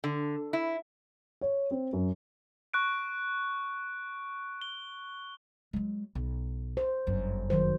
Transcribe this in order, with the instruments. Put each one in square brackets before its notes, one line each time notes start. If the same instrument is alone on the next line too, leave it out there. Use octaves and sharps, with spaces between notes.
[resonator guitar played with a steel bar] D3
E4
[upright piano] C#5
C4
F#2
[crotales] C#6 F#6 D7
G7
[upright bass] F#3 G#3
B1
[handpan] C5
[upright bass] G1 F#2
[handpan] D#3 F#3 C5